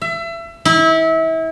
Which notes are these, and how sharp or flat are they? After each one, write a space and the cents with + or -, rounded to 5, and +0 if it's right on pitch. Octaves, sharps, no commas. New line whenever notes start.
E5 +30
E4 -30